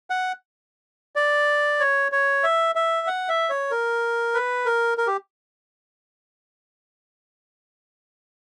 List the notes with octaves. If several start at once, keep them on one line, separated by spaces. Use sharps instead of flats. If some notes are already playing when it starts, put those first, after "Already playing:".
F#5
D5
C#5
C#5
E5
E5
F#5
E5
C#5
A#4
B4
A#4
A#4
G4